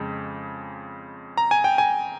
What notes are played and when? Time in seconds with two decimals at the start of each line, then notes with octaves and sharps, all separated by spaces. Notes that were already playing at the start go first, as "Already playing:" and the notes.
Already playing: F2 C#3 G#3
1.37 A#5
1.51 G#5
1.64 G5
1.78 G#5